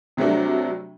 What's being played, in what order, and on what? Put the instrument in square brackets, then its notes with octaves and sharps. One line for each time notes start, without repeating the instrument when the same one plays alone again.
[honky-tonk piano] C3 F#3 G3 A3 D4